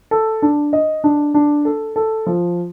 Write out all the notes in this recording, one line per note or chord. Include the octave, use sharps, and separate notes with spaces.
A4
D4
D#5
D4
D4
A4
A4
F3